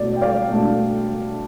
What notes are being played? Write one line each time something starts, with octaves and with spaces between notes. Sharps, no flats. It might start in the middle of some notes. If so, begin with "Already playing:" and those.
Already playing: B2 A3 D5
G5
D5 F5
B2 A3 D4